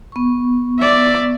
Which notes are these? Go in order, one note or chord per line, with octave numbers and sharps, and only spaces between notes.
B3 C#6
D5 E5